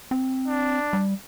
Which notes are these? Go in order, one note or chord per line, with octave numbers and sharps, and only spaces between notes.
C4
D4
G3